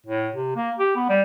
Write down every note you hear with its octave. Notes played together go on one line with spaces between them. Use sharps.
A2
C3
A#3
G4
B3
G3